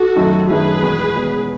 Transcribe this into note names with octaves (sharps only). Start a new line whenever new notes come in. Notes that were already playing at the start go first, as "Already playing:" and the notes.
Already playing: F#4 A4
F#2 D#3 A3 D#4
F#2 D#3 A3 D#4 G#4 B4
E2 B2 G#3 B3
E2 B2 G#3 B3